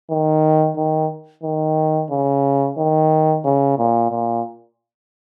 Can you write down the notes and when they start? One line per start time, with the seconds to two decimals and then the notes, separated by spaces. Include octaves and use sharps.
0.10 D#3
0.77 D#3
1.44 D#3
2.11 C#3
2.78 D#3
3.45 C#3
3.78 A#2
4.11 A#2